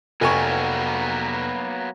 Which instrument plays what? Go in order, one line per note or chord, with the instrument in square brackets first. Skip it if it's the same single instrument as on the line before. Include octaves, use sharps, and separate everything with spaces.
[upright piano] F1 G#5 C#6 [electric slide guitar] F#3 A#3 B3